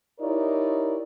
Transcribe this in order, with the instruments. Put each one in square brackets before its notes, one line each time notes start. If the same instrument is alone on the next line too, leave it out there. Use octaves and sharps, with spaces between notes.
[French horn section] D#4 E4 G4 A#4 C#5 D5